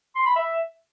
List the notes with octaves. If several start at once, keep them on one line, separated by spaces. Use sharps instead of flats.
C6
B5
E5